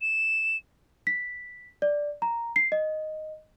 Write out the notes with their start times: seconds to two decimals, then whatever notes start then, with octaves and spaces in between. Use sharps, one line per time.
0.01 E7
1.07 B6
1.82 D5
2.22 A#5
2.56 C7
2.72 D#5